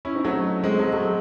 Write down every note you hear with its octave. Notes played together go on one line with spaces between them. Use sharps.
C#4 E4
C4 D#4
F#3 A3
G#3 C4
F#3 A3
F#3 A3